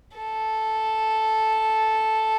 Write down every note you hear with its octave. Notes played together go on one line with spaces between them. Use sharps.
A4